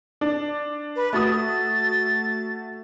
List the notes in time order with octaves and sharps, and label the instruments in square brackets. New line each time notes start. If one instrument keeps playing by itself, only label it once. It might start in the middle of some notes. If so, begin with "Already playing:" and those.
[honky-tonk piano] D4
[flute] B4
[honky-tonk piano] A3 F#4 D#6 [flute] A6